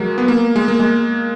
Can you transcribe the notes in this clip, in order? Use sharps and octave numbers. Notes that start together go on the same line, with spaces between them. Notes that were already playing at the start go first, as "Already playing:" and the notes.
Already playing: F#3 G#3 A#3
B3
A#3
G#3
A#3
G#3